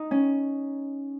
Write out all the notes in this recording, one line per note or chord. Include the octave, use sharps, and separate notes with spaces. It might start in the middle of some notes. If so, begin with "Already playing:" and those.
Already playing: D#4
C#4